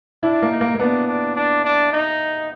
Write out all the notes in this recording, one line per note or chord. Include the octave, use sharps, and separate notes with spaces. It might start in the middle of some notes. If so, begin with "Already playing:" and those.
D4 E4
A#3
D#4
A#3
A#3
B3 D4
D4
D4
D4
D#4